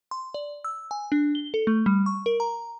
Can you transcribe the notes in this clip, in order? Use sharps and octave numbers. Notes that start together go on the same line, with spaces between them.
C6
D5
E6
G#5
D4
G7
A4
A3
G3
C#6
A#4
A#5